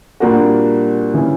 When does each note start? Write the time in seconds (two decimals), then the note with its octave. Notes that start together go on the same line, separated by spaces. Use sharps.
0.20 A#2 G3 A#3 D4 F#4
1.14 C#3 E3